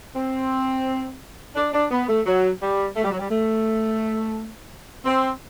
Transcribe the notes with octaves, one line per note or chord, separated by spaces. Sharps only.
C4
D4
D4
B3
A3
F#3
G3
A3
G3
F#3
G3
A3
C4